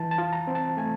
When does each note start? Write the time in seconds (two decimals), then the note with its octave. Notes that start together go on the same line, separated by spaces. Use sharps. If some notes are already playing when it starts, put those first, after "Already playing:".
Already playing: E3 A5
0.11 A5
0.18 F4
0.33 A#5
0.47 C4
0.55 A5
0.77 A3 G#5